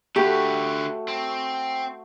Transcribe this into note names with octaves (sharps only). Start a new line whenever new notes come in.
D3 A3 F#4 G4 B4
C4